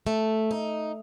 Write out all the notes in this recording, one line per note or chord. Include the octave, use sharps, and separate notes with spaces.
A3
D#4